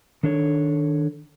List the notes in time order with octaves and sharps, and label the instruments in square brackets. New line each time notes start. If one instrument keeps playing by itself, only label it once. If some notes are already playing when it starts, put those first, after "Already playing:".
[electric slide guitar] D#3 D4 A4 C#5